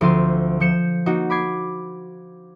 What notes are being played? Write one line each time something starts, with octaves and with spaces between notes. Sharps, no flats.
D2 F3 C4 F4 C6 D#7
F3 G6 C#7 E7
A#3 D#4 F#4
B5 D6 G#6 C7